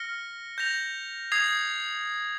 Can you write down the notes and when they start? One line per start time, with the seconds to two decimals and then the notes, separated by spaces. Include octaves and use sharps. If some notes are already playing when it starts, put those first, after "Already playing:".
Already playing: F6 A#6 C#7 G7
0.58 G6 A#6 F7
1.32 D#6 G#6 C7 F7